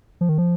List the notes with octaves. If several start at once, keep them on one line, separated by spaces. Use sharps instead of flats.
F3
D#3
F3